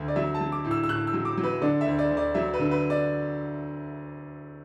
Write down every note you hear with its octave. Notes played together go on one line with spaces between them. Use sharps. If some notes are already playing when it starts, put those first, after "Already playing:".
Already playing: D2 D3
D5
F#3 E5
A5
F#3
D6
A2
E6
E6
A2 F#6
E6
F#3
D6
F#3
B4
D3 D5
E5
D2
D5
D2
D5
F#3 E5
B4
D3
B4
D5